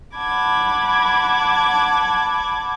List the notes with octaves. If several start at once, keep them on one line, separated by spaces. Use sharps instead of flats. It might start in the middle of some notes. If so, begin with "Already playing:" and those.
F#5 A5 B5 D6 G#6